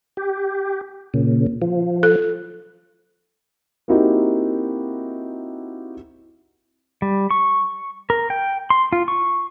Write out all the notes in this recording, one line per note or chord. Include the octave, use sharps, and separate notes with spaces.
G4
A#2 C#3
F3
A4
A#3 C4 D#4 E4 F#4 G4
G3
C#6
A#4
G5
C6
F4
C#6